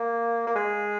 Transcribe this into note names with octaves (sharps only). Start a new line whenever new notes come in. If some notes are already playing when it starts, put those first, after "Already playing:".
Already playing: A#3
A#3
G#3